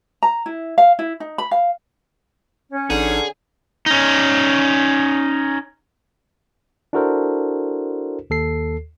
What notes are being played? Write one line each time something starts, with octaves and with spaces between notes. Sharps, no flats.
A#5
E4
F5
E4
D#4
B5
F5
C#4
A1 D3 D4 D#4 G#4
C#4 D#4
D4 E4 F#4 A4 A#4 C5
D#2 A4 C7